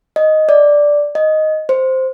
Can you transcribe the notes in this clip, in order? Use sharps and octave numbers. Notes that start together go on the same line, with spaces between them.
D#5
D5
D#5
C5